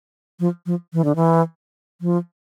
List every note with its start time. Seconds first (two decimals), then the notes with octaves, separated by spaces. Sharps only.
0.40 F3
0.66 F3
0.93 E3
1.05 D3
1.16 E3
2.01 F3